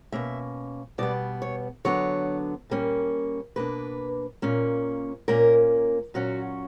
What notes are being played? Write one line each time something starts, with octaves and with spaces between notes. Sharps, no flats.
B2 A#3 C#4 E5
B2 G3 B3 D5
C#5
D3 F#3 B3 D4 C#5
A#2 G3 A#3 C#4
B2 A#3 D4 B4
A#2 A#3 C#4
A#2 A#3 C#4 A#4
A#2 F#3 C#4 F#4